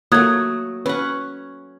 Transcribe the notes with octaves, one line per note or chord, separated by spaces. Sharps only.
F#3 A3 A#3 F#4 D#6 F#6 G#6
C#4 B4 F#5